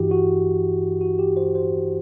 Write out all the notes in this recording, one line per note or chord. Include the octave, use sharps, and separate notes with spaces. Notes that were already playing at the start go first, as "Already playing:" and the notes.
Already playing: G2 E3 E4 F#4 G4
F#4
F#4
G4
C5
C5